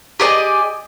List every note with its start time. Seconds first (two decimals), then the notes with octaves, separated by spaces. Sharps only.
0.20 G4 G#4 D5 D#5